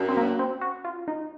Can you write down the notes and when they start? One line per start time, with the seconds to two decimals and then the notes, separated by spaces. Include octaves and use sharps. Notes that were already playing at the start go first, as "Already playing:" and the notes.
Already playing: F#2
0.09 C4
0.17 A#3
0.39 C4
0.61 F#4
0.85 F4
1.08 D#4